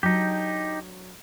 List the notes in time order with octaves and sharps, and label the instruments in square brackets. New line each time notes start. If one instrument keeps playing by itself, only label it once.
[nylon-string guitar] F#3 D4 A4 [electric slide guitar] D#4 G4